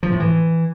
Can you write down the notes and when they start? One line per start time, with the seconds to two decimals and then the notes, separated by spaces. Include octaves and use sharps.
0.03 F3
0.11 A2
0.20 E3